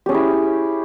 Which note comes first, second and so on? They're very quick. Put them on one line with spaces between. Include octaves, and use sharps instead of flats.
G4 C#4 G#4 E4